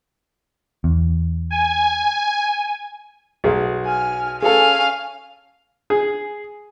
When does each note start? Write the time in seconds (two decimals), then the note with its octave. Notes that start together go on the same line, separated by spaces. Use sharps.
0.84 E2
1.51 G#5
3.44 B1 G#4
3.85 G#5 F6
4.42 C#4 G#4 A4 F5 G#5
5.90 G#4